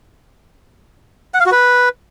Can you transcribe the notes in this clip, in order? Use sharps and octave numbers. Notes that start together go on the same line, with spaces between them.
F#5
F5
F#4
B4